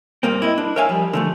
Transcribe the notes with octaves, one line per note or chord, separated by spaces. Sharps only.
G2 A#3 C4
E4 D#5
D4
A#4 C#5 E5 F5 G#5
F3 G3
D3 F3 A3